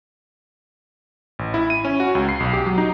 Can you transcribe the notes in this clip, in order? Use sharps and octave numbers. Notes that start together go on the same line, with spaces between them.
A1
E4
D#7
C#4
F#4
C#2
C7
B1
G4
F#3
D#4